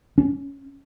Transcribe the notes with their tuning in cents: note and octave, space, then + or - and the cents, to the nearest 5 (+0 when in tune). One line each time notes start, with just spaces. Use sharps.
C#4 +10